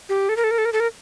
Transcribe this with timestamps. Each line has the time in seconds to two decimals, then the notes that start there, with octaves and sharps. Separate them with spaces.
0.09 G4
0.29 A4
0.37 A#4
0.44 A4
0.51 A#4
0.58 A4
0.65 A#4
0.73 A4
0.80 A#4